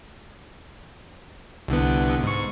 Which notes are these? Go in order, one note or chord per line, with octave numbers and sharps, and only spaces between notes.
C2 D3 B3
G#2 C#6